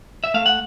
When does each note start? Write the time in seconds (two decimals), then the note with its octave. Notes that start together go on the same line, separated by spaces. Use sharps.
0.24 E5
0.34 A3 F5
0.46 F#5